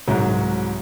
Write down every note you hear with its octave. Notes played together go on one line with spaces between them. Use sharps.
C2 G#2 F#3